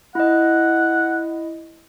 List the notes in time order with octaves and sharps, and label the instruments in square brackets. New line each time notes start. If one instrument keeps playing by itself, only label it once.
[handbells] E4 D#5 [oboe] F#5